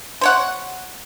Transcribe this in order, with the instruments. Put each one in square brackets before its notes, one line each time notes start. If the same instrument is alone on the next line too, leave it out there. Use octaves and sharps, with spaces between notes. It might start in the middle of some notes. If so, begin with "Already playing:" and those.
[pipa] C5 C#5 F#5